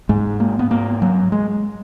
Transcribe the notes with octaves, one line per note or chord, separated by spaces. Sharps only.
G#2 G#3
A#3
B3
G#2 A#3
F#3
G#3